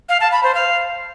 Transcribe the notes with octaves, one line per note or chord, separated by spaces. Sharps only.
F5
A5
B5
C5
F5